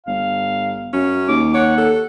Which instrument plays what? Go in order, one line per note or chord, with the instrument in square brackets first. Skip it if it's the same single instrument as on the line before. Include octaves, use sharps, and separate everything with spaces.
[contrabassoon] G1 [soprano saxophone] F5
[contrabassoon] F#2 [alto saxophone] C#4
[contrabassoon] D#2 [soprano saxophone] D6
[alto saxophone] C#5 [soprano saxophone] F#5
[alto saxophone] A4